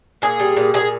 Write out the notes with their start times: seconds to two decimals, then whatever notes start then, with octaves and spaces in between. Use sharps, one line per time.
0.22 A#2 G#4
0.40 G3
0.57 A#2
0.74 A#2 G#4